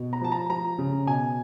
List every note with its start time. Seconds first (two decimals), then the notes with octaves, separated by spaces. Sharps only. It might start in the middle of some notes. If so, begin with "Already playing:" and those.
Already playing: B2
0.13 A#5
0.21 F3 A5
0.32 A#5
0.50 F3 A#5
0.79 C#3
1.06 B2 G#5